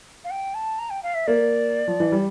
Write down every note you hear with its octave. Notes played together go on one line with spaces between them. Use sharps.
F5
G5
A5
A#5
G5
F5
E5
A#3 D5
F3
E3
G3